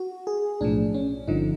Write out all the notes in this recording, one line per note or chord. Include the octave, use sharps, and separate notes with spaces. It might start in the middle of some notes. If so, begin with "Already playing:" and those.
Already playing: F#4
G#4
B1 A2 F3 D4
C#4
G1 G2 D3 F3 D#4